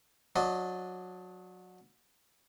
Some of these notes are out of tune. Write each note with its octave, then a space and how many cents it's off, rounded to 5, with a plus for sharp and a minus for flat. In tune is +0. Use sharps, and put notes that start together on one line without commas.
F#3 -20 D4 +0 D#5 -15